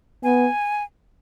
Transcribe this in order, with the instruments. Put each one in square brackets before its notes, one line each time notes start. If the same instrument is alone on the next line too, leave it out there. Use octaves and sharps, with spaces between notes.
[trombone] B3 [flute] G#5